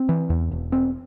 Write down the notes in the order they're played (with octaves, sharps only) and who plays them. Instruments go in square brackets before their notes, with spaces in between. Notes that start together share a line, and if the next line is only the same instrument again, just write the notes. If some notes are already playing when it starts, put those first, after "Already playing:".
Already playing: [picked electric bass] C4
E3
E2
E1
C4